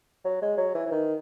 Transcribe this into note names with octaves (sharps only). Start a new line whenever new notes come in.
F#3
G#3
F#3
E3
E3
D#3